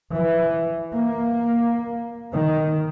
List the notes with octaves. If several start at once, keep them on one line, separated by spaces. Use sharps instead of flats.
E3
A#3
D#3